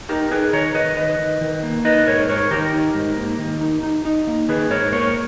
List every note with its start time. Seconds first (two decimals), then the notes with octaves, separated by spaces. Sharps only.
0.09 D#4 G4 A#4
0.31 D#4 G#4 B4
0.53 D#3 A#4 C#5
0.75 D#3 B4 D#5
0.97 D#3 B4 D#5
1.19 D#3
1.41 D#3
1.63 A#3
1.85 D#4 B4 D#5
2.07 G#2 A#4 C#5
2.29 G#2 A#4 C#5
2.51 D#3 G4 A#4
2.73 D#4
2.94 G#2
3.17 A#3
3.39 D#3
3.61 D#4
3.83 D#4
4.05 D#4
4.27 A#3
4.49 D#3 G#4 B4
4.70 G#2 A#4 C#5
4.92 A#3 A#4 C#5